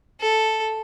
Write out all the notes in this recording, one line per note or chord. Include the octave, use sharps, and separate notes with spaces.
A4